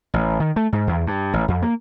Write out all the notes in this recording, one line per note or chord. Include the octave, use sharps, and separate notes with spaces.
A1
D#3
A3
G#2
E2
G2
A1
F2
A#3